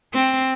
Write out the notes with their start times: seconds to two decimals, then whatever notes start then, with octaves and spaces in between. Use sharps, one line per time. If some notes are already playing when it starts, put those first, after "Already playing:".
0.14 C4